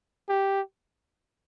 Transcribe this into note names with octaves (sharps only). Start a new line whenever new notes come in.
G4